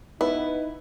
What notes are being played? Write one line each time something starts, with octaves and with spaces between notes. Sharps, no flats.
B3 D#4 E4 B4